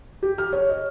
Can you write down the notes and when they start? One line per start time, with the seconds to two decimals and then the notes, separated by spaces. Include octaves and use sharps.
0.23 G4
0.38 F6
0.53 C#5
0.69 D#5